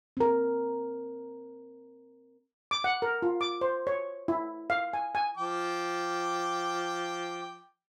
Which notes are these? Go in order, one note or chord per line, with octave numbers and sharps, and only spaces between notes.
C4 A#4
D6
F#5
A#4
F4
D6
C5
C#5
E4
F5
G#5
G#5
F3 G5 D6